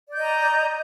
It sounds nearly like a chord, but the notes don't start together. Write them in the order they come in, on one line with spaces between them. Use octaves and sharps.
D5 G6 D#5 A#5